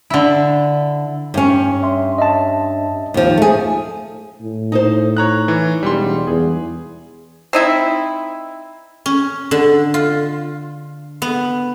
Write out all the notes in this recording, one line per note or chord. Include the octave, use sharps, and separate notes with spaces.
D3 E4
G2 C#4
C#5 E5 C6
D#5 E5 A5
D#2 F3
A3 G#4
A2
D#4 A4 C5
C#5 A#5 F#6
E3
E1 G3 C6
E2 G#4
C4 D#4 E4
C#4
D3
F4
B3